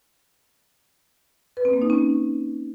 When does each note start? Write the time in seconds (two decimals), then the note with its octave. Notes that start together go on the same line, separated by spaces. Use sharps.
1.57 B4
1.65 C4
1.73 A#3
1.82 D#4
1.90 C#4